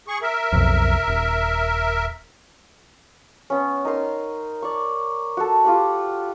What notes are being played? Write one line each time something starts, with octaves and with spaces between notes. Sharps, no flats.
G#4 C#6
A#4 E5
B1 F2
D#1
B3 C#4
D#4 A#4 C6
D5 C#6
F#4 A4
F4 G4 F#5